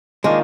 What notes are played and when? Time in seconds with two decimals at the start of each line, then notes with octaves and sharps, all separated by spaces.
0.24 D#3 G#3 A#3 D4 F4 A#4